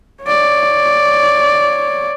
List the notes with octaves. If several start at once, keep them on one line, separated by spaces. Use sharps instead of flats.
C#5 D5